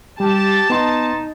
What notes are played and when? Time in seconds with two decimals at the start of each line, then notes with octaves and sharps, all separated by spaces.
0.20 G3 G4 A5
0.70 B3 D#4 C6